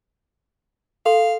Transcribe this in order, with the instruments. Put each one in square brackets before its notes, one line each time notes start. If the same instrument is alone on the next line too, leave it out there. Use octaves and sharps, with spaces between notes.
[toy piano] A4 C6 [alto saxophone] F5